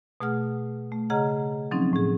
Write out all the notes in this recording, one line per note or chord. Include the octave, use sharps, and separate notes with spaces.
B2 A3 G#4 F#5 F6
A3
C#3 G#4 D#5 F#5 A#5 F6
F3 F#3 C4 C#4 D#4
A2 G#4